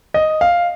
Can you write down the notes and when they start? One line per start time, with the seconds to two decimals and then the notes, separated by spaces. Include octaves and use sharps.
0.14 D#5
0.41 F5